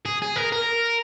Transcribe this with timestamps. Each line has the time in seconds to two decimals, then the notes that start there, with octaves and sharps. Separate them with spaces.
0.06 G#4
0.22 G#4
0.36 A#4
0.52 A#4